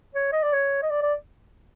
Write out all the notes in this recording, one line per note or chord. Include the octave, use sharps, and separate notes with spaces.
C#5
D#5
D5
C#5
D#5
D5
D5